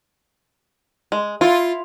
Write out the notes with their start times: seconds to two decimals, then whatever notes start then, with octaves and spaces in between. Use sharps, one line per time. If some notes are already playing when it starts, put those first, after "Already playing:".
1.12 G#3
1.41 E4 F4